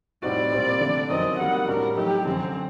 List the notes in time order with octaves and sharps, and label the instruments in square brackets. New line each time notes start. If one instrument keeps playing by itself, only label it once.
[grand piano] A2 G3 C4 D#4 F#4 [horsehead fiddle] D5
[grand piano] A#2 G3 C4
D3 A3 D4 A4
[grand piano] F#2 D#3 F#3 C4 [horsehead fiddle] D#5
[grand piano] D#3 G3 A#3 [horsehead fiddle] F#5
[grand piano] A2 G3 D4 F#4 [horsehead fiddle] A#4
[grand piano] F#3 A3 D#4 [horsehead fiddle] G4
[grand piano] F#2 D3 F#3 [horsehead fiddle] C4